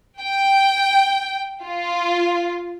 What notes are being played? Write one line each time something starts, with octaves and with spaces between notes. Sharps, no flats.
G5
F4